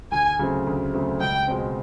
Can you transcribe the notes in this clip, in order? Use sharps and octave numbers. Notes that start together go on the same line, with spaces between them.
D2 G#5
C#3 F#3 A3 C4
D2
C#3 F#3 A3 C4
C#2 G5
B2 G#3 C4